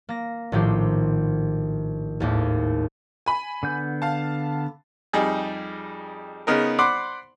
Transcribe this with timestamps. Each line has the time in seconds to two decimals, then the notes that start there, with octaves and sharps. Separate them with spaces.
0.09 A#3 A#6
0.52 A#1 A2 D#3 G4 C5
2.20 G#1 D#2 A2
3.26 G#5 B5
3.63 D3 B3 G6
4.02 F5 A5
5.13 F2 G3 D#4 G#4
6.47 C#3 B3 D#4 A#4
6.79 C5 D5 F#5 B5 C6 D6